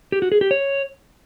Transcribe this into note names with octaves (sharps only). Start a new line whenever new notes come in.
G4
F#4
G#4
G4
C#5